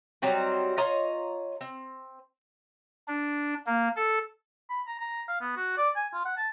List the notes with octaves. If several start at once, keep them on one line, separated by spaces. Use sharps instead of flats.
F#3 G3 C4 D#4
F4 C#5 D#5 A#5
C4
D4
A#3
A4
B5
A#5
A#5
F5
B3
F#4
D5
G#5
F4
F#5
A5